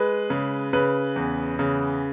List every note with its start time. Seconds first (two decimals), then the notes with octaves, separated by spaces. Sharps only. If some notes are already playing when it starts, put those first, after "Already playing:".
Already playing: G#3 B4
0.30 C#3
0.73 C#3 B4
1.16 E2
1.59 C#3